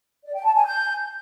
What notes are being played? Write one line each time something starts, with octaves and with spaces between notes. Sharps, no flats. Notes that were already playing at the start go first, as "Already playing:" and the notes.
D5
G5
A5
G#5
G6